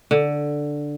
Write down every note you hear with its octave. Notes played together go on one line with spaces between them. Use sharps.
D3